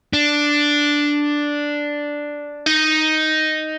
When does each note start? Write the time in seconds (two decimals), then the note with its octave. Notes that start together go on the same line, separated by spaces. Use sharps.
0.13 D4
2.66 D#4